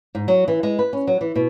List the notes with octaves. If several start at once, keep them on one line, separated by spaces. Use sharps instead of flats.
G#2
F#3
E3
G#3
B4
C#4
F#3
E3
B2